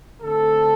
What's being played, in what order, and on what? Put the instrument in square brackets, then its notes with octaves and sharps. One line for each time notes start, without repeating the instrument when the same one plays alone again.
[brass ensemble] D3 A3 C4 A4